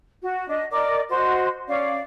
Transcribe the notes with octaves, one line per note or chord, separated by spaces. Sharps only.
F#4
D4 D#5
A#4 D5 D#5 D6
F#4 C5 D#5 C6
C#4 D5 F5